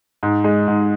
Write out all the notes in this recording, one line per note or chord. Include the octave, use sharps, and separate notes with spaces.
G#2
G#3
G#2